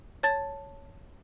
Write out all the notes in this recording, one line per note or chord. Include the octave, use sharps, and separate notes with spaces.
C#5 A5 A6